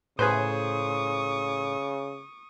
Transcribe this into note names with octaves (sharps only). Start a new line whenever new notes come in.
A2 C#3 G#4 B4 C5 C#6 D#6